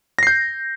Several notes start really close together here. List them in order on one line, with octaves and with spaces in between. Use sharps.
A#6 C7 G6